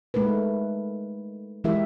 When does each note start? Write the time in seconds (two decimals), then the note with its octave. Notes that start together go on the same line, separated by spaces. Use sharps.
0.14 G#3 A3 D#4 A#4 B4
1.64 E3 G#3 E4 G4 A#4 E5